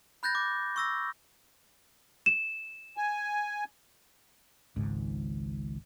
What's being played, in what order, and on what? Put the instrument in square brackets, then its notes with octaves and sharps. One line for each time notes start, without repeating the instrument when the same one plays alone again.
[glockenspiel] B5 F#6 G6 A6 A#6
D6
C#6 E6 A#6
[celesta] E7
[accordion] G#5
[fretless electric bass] G#1 C#2 G#2